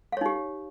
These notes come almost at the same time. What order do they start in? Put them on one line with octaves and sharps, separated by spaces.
F5 C#5 D#4 G4